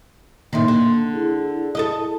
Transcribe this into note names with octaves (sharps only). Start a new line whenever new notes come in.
A2 C3 D#3 A#3 C6
D3
E4 G#4
A4 A#4 D#5